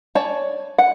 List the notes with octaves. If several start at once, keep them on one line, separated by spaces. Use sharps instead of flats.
C#5 D5 G#5 A5
F#5